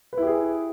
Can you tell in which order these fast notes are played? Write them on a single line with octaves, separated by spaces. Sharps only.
B4 E4 G4 G#4